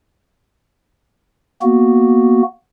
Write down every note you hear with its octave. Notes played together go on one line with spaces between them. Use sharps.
A#3 B3 F#4